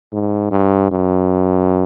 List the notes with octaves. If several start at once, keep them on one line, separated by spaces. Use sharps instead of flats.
G#2
G2
F#2